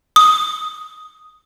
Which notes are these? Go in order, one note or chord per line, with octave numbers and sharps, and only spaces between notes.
D#6